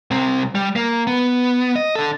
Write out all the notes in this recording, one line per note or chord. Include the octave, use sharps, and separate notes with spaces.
C2 C4
G3
A#3
B3
D#5
D4 A4